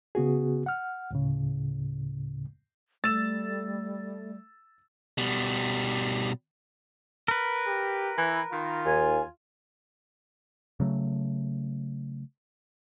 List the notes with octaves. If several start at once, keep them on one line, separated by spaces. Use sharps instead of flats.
C#3 B3 F#4 G#4
F#5 F6
D2 A2 C#3
G3 A3 E6 A6 E7
B2 G3
A#4 B4
G4
E3 E4
D#3 F4
D#2 G#5
C#3 F#3 A3